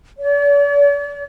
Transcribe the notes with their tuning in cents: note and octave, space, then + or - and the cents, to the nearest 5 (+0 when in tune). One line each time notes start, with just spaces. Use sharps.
D5 -45